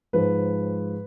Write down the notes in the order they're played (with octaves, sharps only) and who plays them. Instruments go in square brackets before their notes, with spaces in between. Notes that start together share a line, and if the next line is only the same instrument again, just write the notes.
[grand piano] G#2 F3 G#3 B4